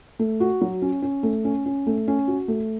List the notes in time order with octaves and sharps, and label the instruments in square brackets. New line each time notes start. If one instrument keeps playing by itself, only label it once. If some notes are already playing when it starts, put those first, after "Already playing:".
[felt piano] A3
F#4
F#3
C#4
C#4
A3
C#4
C#4
A3
C#4
F#4
A3